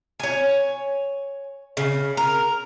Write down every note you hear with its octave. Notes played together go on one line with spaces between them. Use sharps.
C#5 G#5
C#3
A#4